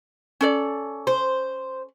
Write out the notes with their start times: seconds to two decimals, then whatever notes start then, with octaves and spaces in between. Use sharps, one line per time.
0.41 C#4 A4 D5
1.07 C5